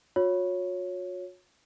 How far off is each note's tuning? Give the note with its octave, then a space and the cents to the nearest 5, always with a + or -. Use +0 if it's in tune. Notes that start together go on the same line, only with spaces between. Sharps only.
F#4 -45 C#5 +0